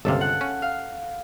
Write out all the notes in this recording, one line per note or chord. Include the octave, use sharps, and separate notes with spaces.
G1 C#2 C3 A4 F5
F#5 F#6
C#4
F5